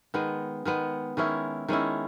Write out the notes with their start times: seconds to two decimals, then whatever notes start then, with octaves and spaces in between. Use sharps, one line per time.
0.14 D#3 G#3 B3
0.65 D#3 G#3 B3
1.17 D#3 G#3 C#4 E4
1.68 D#3 G#3 C#4 E4